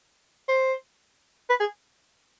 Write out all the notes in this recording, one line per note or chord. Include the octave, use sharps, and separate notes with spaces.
C5
B4
G#4